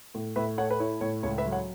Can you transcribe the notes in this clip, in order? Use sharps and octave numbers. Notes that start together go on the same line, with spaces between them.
A2
A2 B4 E5
A3 C#5 F#5
B4
E4 C#5
A2 C#5
C#2 C#5
B4 E5
F#3
C#5 F#5